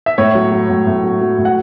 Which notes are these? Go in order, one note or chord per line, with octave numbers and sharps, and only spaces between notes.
E5
A2 C#5
F#3
F#3
A2
A2
F#3
F#3
A2
F#5